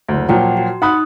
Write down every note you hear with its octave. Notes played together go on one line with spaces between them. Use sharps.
F#1 D2
A#2 F3 F#3 F#5 G5
F#4
D#4 F#5 B5 D#6 F#6